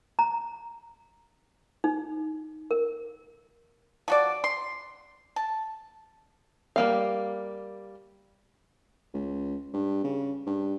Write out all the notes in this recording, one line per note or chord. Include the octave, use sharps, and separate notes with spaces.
A#5
D#4
A#4
F3 F#4 D5
C6
A5
G3 A#3 F5
C#2
G2
C#3
G2